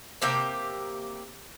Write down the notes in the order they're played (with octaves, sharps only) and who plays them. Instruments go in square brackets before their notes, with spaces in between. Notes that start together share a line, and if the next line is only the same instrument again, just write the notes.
[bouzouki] C3 A#3 G4 E5